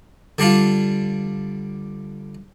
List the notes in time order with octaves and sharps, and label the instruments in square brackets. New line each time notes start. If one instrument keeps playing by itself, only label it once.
[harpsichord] D3 G3 D4 F4